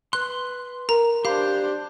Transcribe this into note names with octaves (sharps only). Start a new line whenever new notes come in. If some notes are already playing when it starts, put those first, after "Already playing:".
B4 C6 F#6
A#4 A#5
D4 G4 C5 F5 B5